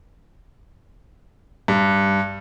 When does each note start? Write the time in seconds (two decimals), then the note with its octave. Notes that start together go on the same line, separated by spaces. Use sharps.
1.68 G2